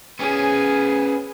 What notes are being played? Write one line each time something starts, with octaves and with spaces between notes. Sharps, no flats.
B3 C#4 G#4